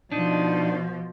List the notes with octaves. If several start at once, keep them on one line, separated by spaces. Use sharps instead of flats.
B2 F3 D4 D#4